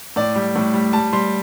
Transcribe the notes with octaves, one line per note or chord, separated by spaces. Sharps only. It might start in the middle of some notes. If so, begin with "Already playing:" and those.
A2 D5
G3
A2
G3
G3 A5
G3 C6